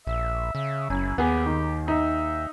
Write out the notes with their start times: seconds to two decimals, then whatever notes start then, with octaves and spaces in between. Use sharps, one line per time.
0.07 A#1 E5
0.55 C#3 E5
0.90 F#1 F#2 E4
1.18 D#2 B3 G4 G#4
1.46 D#3
1.88 D#4 E5